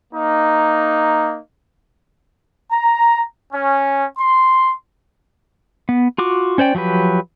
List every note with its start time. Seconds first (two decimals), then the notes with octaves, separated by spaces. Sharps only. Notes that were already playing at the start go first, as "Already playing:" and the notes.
0.13 A#3 D#4
2.71 A#5
3.52 C#4
4.18 C6
5.89 B3
6.18 F4 F#4 D6
6.58 C#4 C5 D5 G5
6.75 F3 F#3 G4 B4